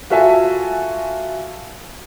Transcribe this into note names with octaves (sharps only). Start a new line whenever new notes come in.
F4 F#4 A4 E5 G#5 A5